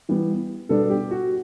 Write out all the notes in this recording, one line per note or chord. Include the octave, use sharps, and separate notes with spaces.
E3 G3 B3
B2 G3 B3 D4 A4
G4
F#4